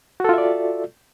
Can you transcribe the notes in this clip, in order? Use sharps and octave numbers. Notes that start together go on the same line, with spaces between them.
F4 F#4 A4 D5 E5